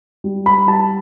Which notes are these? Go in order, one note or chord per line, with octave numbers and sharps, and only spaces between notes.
G3
B5
G3 A5